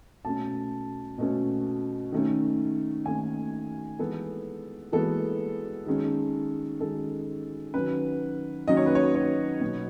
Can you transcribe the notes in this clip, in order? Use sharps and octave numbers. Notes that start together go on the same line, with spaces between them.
B2 A3 C#4 A5
B2 A3 C#4
D#3 A3 C#4
D#3 A3 C#4 G#5
E3 G#3 B3 A4
E3 G#3 B3 A4
D#3 G#3 C#4
D#3 G#3 C#4 A4
D#3 F#3 C#4 B4
D#3 F#3 C#4 D#5
C#5
B4
C#5
C#5
B2 F#3 B3